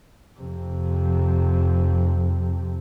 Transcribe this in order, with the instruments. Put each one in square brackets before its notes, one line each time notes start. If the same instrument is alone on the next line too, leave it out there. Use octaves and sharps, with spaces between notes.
[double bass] F2 C3